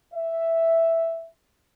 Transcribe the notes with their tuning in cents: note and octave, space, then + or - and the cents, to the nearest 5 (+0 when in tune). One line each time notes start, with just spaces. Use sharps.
E5 +0